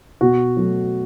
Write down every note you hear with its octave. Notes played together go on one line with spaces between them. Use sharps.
B2 F#4
F#3 A3